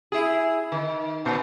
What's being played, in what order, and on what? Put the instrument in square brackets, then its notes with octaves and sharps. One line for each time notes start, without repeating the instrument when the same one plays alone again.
[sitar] E4 G#4
D#3
A#2 B3